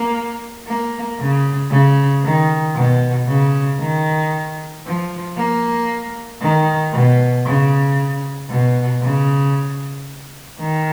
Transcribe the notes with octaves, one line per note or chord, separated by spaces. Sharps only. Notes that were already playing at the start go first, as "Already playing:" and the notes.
Already playing: A#3
A#3
C#3
C#3
D#3
B2
C#3
D#3
F3
A#3
D#3
B2
C#3
B2
C#3
D#3